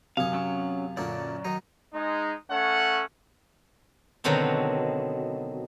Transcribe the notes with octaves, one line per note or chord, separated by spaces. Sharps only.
F#2 C3 C#5 F5 G#5 D#6
F#3 C#4 E6
F#2 A#2 D3 D4 D5
D#3 F#3 D#4 A#5
G#3 D#4
A3 C#4 A4 F#5
B2 D3 D#3 F#3 C4 D#4